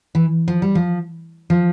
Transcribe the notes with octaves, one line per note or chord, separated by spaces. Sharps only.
E3
F3
G3
F3
F3